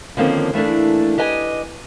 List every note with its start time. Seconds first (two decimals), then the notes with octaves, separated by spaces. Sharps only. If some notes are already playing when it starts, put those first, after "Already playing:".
0.17 D3 D#3 F3 A#3 C4 C#4
0.53 E3 A3 A#3 D4
1.18 G4 B4 D#5 G#5